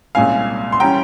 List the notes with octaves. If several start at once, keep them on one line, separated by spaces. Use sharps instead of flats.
C2 A#2 G#3 C#4 F5 G#5
C6
E3 G3 C#4 G5 A#5